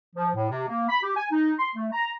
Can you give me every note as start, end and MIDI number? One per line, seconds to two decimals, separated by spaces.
0.16 0.29 53
0.35 0.49 45
0.50 0.65 48
0.68 0.88 58
0.89 0.98 83
1.03 1.15 67
1.17 1.26 80
1.32 1.54 63
1.59 1.71 84
1.76 1.88 57
1.93 2.12 82